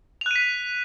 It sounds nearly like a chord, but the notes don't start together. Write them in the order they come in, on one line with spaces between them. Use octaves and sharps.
F7 F#6 D#7 B6